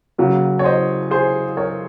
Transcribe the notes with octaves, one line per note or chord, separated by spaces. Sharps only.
C#3 F#3 A#3
C#5
C5 D#5
G#4 C5
A#4 C#5